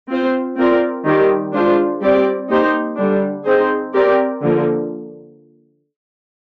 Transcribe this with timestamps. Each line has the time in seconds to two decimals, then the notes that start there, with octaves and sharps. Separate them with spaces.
0.09 C4 F4 C5
0.56 C4 F4 A#4 D5
1.04 D#3 G3 C4 G4
1.53 G#3 D4 F4 C5
2.01 G3 C4 G4 D5
2.49 A#3 D#4 G4 C5
2.97 D3 G3 D4
3.45 C4 D#4 G#4 C5
3.93 C4 G4 A#4 D5
4.41 D3 F3 A#3